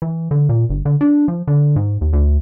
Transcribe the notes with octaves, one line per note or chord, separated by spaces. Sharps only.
E3
D3
A#2
G1
D3
D4
F3
D3
G#2
D#2
D2